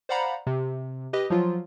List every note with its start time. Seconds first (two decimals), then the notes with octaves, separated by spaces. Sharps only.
0.09 C5 D5 F5 F#5 A#5 B5
0.47 C3
1.13 G4 B4 D#5
1.30 F3 F#3 F4